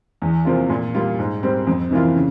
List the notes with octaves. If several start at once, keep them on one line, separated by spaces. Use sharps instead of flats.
E2
C3 F3 A#3 F4
A#2
G3 A#3 F4
G#2
G3 C4
F2
C3 E3 A#3 F4
C#3